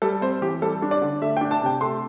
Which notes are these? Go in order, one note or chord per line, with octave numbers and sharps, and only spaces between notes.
G3 A4
C4 C5
E3 G4
G3 A4
D4
D5
D3
A3 E5
G5
D4
A5
C3 G5
A3 C6